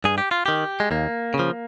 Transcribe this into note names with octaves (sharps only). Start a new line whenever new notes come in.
G2 G#4
G4
F4
D#3 G4
G#3
D#2 A#3
C#3
F3